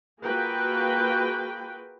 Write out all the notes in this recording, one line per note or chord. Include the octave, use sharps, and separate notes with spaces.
A#3 F4 F#4 G#4 B4 G5